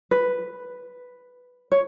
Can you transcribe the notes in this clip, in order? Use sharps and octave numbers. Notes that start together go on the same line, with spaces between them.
B4
C#5